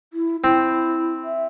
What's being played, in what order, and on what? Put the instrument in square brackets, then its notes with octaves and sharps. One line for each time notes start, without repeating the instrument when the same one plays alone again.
[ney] E4
[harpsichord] C4 [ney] E4
[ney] E5